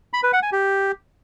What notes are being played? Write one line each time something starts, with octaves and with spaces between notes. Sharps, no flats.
B5
B4
F#5
G#5
G4